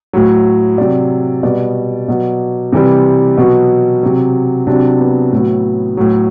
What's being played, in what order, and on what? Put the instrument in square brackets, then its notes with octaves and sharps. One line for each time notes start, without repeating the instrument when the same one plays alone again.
[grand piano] A2 F#3
C3 F#3 D5
B2 G3 D5
B2 F#3
C3 E3 G3
B2 F#3
C3 F#3
C3 F#3 D4
B3
A2 F#3
A2 F#3